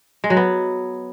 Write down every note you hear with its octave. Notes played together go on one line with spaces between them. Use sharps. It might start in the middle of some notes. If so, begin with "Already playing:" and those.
G#3
F#3
B3